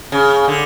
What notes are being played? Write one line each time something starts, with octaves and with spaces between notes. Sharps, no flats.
C#3
D3